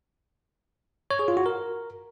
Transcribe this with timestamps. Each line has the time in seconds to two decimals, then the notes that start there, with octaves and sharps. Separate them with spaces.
1.11 C#5
1.19 G#4
1.28 F4
1.37 F#4
1.46 A#4